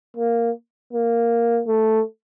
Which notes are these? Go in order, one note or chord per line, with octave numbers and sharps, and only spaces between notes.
A#3
A#3
A3